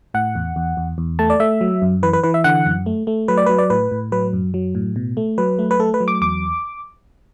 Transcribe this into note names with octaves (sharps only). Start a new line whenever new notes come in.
A2 F#5
E2
E2
E2
E2
A3 A5
D5
A3 E5
F#3
F#2
E3 B4
B4
E3 B4
E5
D3 F#5
F#2
A3
A3
F#3 B4
D5
F#3 B4
D5
A2 B4
A2
F#3 B4
F#2
F#3
A2
B2
A3
F#3 B4
A3
B4
A3 A4
B4
F#3
D6
E2 D6